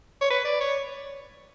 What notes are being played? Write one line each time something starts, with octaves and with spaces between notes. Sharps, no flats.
C#5
B4
D5
C#5